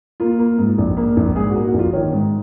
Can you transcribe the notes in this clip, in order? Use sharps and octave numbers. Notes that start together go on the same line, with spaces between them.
A#3 F4
A#3
G#2
A#1
A#3
A#1
G#2 G#4
F#4
A#3
F#4
A#1 F4
D#3 C#5
G#2